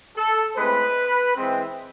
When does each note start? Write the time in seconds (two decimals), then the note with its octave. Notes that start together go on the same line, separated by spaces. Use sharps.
0.16 A4
0.56 A2 G#3 C4 B4
1.35 E3 G#3 C4